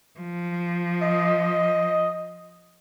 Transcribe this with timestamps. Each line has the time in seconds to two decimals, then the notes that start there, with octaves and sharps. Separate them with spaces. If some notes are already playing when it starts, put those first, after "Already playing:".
0.19 F3
1.01 D#5